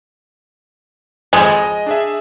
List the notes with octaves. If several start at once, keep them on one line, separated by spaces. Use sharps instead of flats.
G#1 F2 G#3 C5
D#5
D4 G#4 E5